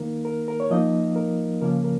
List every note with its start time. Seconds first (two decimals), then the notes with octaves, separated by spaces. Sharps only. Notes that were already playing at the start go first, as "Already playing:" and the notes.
Already playing: D#3 A#3 D#4 A#4
0.25 A#4
0.48 A#4
0.60 C#5
0.70 F3 A#3 D#4 D#5
1.16 A#4
1.61 C#3 F3 A#3 C#4 A#4
1.84 A#4